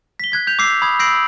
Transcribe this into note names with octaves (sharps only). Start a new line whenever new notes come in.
B6 G7
F#6 G#6 B6
G6 F7
D6 E6 C7
B5 D#6 G#6
E6 G6 A#6 C7 D7 F#7